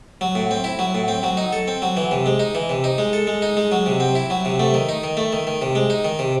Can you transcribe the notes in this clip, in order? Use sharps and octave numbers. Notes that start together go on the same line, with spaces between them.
F#3
A2
C4
E4
F#3
A2
C4
F#3
D#4
A4
C4
F#3
E3
C3
G#3
D#4
E3
C3
D#4
G#3
A4
G#3
D#4
G#3
F#3
C3
C4
E4
F#3
C3
A3
D#3
D#4
D#3
A3
D#3
D#3
C3
G#3
D#4
D#3
C3